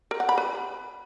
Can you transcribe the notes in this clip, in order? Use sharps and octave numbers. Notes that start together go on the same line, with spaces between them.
A#4
F#5
B5
B4